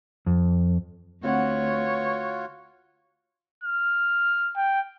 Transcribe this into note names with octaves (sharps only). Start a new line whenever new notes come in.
F2
D2 C4 F4 F#4 B4 C#5 F#5
F6
G5